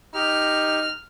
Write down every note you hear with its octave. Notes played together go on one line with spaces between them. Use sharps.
D#4 G4 F6